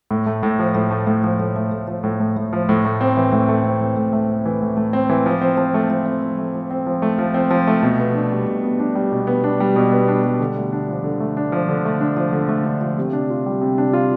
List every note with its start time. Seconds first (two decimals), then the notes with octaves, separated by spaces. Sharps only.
0.11 A2
0.26 A3
0.43 A2
0.59 F3
0.75 A2
0.91 A3
1.07 A2
1.23 F3
1.39 A2
1.56 A3
1.72 A2
1.87 F3
2.04 A2
2.20 A3
2.37 A2
2.53 F3
2.69 A2
2.85 A3
3.01 C4
3.17 E3
3.32 A2
3.49 A3
3.64 C4
3.80 E3
3.97 A2
4.13 A3
4.30 C4
4.45 E3
4.62 A2
4.77 A3
4.93 C4
5.10 E3
5.26 F3
5.41 C4
5.57 F3
5.74 A3
5.90 F3
6.06 C4
6.22 F3
6.38 A3
6.54 F3
6.71 C4
6.86 F3
7.02 A3
7.18 F3
7.34 C4
7.51 F3
7.67 A3
7.82 B2
7.99 B3
8.15 D4
8.32 G3
8.47 B2
8.63 B3
8.80 D4
8.95 G3
9.12 B2
9.27 B3
9.44 D4
9.60 G3
9.76 B2
9.92 B3
10.08 D4
10.24 G3
10.40 D3
10.56 A3
10.73 D4
10.89 F3
11.04 D3
11.20 A3
11.37 D4
11.52 F3
11.69 D3
11.85 A3
12.01 D4
12.17 F3
12.33 D3
12.49 A3
12.65 D4
12.81 F3
12.98 C3
13.13 D4
13.30 F4
13.46 G3
13.61 C3
13.78 D4
13.93 F4